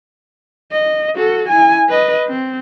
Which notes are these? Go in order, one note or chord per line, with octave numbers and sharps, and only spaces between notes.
D#5
F#4 A4
E4 G#5
B4 D#5
C4